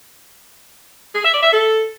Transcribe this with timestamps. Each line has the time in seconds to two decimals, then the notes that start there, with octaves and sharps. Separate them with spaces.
1.15 G#4
1.24 E5
1.34 D5
1.43 E5
1.52 A4